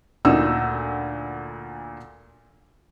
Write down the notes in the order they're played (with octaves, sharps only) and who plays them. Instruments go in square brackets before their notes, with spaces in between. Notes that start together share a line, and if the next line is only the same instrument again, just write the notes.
[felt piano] D2 A#2 D#4 E6